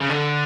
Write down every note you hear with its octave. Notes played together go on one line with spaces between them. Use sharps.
C#3
D3